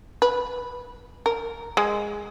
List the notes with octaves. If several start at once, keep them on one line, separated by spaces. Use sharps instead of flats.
B4
A#4
G#3